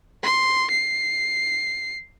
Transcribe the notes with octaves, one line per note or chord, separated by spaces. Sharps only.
C6
C7